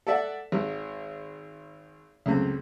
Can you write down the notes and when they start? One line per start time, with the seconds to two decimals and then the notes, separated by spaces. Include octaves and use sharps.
0.07 A4 D5 E5 F#5
0.52 G#1
2.26 C#2 F#2 A3 C4